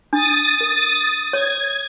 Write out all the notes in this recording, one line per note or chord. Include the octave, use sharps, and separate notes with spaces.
D4 D#6 A6
A#4
C#5 G#6